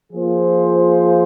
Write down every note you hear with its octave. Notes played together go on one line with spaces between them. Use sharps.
F3 A#3 F4 G#4 C5